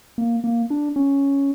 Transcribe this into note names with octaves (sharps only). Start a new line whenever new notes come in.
A#3
A#3
D4
C#4